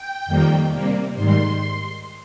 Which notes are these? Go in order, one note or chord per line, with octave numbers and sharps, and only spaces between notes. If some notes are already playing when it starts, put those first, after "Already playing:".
Already playing: G5
F2 D#3 G3 A#3
C3 G3 A#3
G#2 D#3 G3 C6